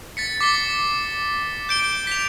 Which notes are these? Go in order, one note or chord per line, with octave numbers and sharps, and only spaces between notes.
A6 B6 C#7
D6 B6 C7 G7
G6 D7 G7
B6 F7